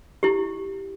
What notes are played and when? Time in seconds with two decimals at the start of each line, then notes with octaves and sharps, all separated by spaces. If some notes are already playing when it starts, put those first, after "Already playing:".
0.23 E4 G4